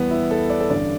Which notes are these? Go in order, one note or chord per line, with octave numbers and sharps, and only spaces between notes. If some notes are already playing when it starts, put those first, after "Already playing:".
Already playing: E2 E3 G3 B3
E4
A4
D5
A4
A1 G2 D3 G3 D5